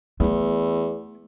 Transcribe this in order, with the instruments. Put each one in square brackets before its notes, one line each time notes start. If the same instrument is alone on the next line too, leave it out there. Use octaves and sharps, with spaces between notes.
[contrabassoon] E2 [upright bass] A3 E4